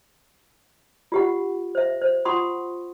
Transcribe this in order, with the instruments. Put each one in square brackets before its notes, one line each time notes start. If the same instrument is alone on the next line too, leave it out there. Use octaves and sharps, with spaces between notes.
[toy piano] F4 G4 F#5
C5 E5
C5
F4 F#5 C6 C#6 D#6